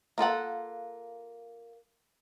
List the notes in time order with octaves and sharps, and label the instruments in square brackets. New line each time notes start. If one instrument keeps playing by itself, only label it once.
[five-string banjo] A#3 F4 A4 F#5